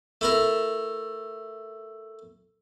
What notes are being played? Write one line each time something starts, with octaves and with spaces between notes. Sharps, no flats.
A3 E4 A#4